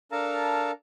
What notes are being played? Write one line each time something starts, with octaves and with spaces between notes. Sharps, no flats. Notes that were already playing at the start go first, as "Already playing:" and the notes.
D4 A4 A#4 F5 A5 A#5